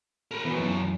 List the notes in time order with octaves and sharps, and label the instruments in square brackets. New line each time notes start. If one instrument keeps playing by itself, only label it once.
[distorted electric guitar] A#4 B5
[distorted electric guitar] E3 F#3 [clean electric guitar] B3
[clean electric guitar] F#2